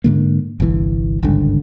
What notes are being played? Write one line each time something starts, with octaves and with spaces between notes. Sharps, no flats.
G#2 D3 A#3
G1 C2 A#2 E3
G#1 C#2 G2 D3